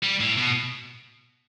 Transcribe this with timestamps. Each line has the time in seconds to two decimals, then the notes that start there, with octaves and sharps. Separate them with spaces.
0.03 G3
0.21 A2
0.37 B2